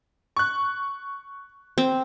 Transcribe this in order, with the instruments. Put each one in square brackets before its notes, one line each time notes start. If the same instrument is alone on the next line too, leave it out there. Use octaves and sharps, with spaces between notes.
[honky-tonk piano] C#6 F#6
[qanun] C4